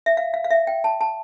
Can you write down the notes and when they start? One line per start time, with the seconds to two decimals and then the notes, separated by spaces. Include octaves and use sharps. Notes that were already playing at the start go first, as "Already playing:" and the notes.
0.06 E5
0.17 F5
0.34 F5
0.44 F5
0.51 E5
0.67 G5
0.84 A5
1.01 A5